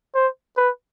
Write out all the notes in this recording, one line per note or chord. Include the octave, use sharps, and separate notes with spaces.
C5
B4